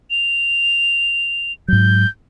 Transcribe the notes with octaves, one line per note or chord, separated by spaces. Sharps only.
F7
G#2 F#3 G6